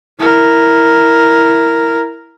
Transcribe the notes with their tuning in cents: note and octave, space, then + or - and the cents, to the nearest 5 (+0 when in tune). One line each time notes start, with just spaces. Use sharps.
E4 +0 A#4 +0